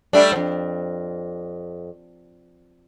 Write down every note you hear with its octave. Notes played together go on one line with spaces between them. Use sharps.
G3 A3 D4
F2 G#2